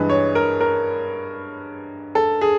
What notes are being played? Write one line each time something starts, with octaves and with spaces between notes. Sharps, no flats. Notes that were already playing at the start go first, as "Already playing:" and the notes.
Already playing: G2 E3 G#3 B4
C#5
A#4
A#4
A4
G#4